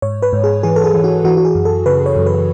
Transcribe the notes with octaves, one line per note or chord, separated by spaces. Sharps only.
G#2 C#5
B4
G#2
G#4
E3 G#4
A4
G#4
E3
F#4
E3 F#4
F#4
G#4
F#2
A4
C#3 B4
C#5
F#2
B4